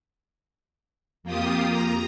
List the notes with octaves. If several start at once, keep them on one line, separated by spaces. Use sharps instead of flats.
F2 A#3 F4 G4 D#6
A#5